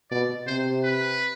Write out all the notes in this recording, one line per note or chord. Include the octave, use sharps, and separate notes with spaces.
B2 D5
C3 C5
B4